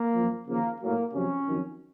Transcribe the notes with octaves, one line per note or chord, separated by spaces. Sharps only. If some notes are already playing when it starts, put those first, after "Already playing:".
Already playing: A#3
F#2 F3
D#2 C#3 F3 A#3
A2 F#3 A#3
F2 C3 F#3 C#4
F2 D#3 F#3